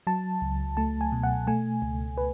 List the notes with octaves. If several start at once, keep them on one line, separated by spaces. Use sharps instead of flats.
F#3 A5
C#2
A3 A5
G#5
B2
F#5
A3 G#5
C#2
B4